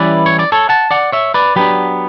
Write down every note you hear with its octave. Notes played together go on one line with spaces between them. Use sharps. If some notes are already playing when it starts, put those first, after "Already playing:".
Already playing: E3 G3 C#4 E4 B4 D5
C#5
D5
A4 C#5
F#5 A5
D5 F#5
C#5 E5
B4 D5
F#3 B3 D4 G4 B4